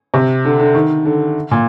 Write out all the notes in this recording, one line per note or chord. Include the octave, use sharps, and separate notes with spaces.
C3
D3
D3
D#3
D3
A#2